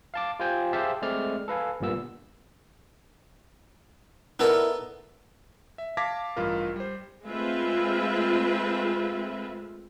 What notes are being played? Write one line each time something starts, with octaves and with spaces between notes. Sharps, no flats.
F5 A5 D6
F4 G4 C5 G5 G#5
G4 G#4 C5 E5 F5 A5
G#3 A3 C4 D5 F6
A4 B4 F5 G#5
G1 G2 A#2 B3 E6
B3 D#4 E4 A4 A#4 D5
E5
F5 A5 D6 G#6 A#6 B6
A1 G2 F4 A#4
G3 C5
G#3 A3 C4 F4 B4 E5